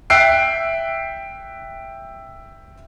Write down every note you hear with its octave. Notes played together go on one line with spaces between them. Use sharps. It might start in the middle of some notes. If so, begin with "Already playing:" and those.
E5 G5 E6 F#6 C7 D7